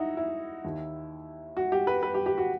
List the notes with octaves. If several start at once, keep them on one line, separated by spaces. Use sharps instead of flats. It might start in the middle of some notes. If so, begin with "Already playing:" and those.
Already playing: D#4 E4 F#4
E4
D#2 D#3
F#4
G4
B4
B4
G4
G4
F#4